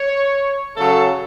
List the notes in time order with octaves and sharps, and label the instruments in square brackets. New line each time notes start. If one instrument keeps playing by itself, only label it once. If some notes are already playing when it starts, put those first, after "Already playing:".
Already playing: [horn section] C#5
C#3 F#3 A4